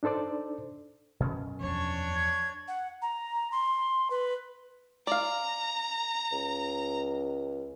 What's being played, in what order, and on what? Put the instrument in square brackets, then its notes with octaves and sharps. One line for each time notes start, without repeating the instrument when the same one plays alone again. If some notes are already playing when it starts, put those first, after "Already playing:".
[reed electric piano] D4 D#4 A4 C5 D5
[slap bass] F#2 B2 C#4
[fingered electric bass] E2 F3 [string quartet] D4 C#5
[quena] G#6
[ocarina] F#5
A#5
C6
B4
[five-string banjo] D5 F5 [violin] A#5
[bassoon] C#2